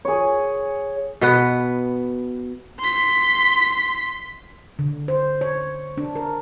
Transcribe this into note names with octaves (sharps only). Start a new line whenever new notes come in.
G#4 C#5
B2 B3 B4
C6 B6
D3
C5
C#5
D4
A#4